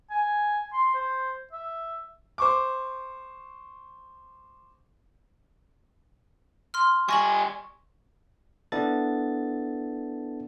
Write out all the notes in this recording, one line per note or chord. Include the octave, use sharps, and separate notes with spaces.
G#5
C6
C5
E5
C5 C#6 D6
C6 F6
G3 G#5 C#6 A#6 F#7
B3 D4 E4 A4 A6